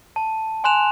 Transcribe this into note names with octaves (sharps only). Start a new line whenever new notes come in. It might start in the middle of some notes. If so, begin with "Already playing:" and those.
A5
G#5 C6 F#6 E7 F7